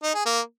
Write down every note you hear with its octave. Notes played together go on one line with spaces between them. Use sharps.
D#4
G#4
A#3